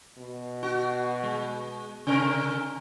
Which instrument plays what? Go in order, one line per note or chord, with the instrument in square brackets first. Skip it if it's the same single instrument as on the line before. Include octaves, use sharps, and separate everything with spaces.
[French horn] B2
[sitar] F#4
G#3
C3 A#4